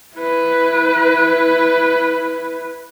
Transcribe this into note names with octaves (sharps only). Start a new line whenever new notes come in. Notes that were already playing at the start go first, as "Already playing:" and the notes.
E4 B4